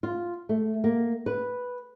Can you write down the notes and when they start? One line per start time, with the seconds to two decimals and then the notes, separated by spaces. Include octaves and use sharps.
0.03 F4
0.49 A3
0.84 A#3
1.26 B4